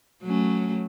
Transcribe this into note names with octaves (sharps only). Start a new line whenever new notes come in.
F#3 A3 C#4